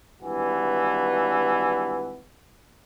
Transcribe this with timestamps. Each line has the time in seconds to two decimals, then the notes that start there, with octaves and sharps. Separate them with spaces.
0.22 G#1 G2 E3 F#4